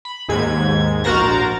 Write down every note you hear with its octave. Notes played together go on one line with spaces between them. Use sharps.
B5
D#2 G#2 G#6
A#1 F#4 A#4 C5 A#5 A6